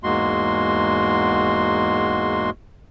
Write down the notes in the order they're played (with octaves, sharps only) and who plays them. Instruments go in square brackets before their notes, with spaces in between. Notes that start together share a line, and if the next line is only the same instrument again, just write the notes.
[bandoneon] E2 G#2 G#3 A#3 F#4 C6